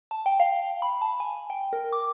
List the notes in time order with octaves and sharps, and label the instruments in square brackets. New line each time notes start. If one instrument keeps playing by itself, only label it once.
[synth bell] A5
G5
F5
B5
A5
G#5
G5
A#4
D6